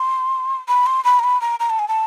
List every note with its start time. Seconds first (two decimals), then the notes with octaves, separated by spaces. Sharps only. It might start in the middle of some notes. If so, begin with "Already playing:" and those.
Already playing: C6
0.68 B5
0.86 C6
1.04 B5
1.19 A#5
1.24 B5
1.41 A#5
1.60 A#5
1.70 A5
1.79 G#5
1.88 A5